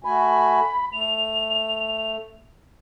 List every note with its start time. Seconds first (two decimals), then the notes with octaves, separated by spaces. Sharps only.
0.04 A3 F#4 G#5 B5
0.93 A3 F7